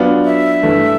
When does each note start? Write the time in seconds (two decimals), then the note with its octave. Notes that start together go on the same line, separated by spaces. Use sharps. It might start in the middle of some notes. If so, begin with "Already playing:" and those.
Already playing: F#3 B3 D4 F4
0.25 E5
0.63 G2 E3 A3